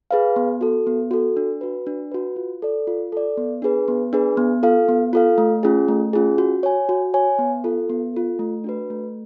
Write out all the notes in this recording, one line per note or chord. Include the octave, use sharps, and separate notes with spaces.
G#4 B4 F5
B3
F#4 A4
B3
F#4 A4
D4
F#4 B4
D4
F#4 B4
F4
A4 D5
F4
A4 D5
B3
D4 G#4 B4
B3
D4 G#4 B4
B3
F4 A4 F5
B3
F4 A4 F5
A3
C#4 F4 G#4
A3
C#4 F4 G#4
F#4
C#5 G#5
F#4
C#5 G#5
B3
F4 A4
B3
F4 A4
A3
D4 F#4 B4
A3